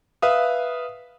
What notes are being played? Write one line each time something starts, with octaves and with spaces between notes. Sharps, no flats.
B4 E5 F5 D#6